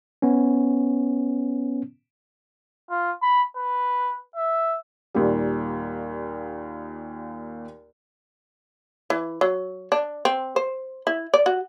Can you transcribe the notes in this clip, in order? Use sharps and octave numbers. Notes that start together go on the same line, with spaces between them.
B3 C#4
F4
B5
B4
E5
D#2 A#2 G3
E3
F#3
D4
C4
C5
E4
D5
F#4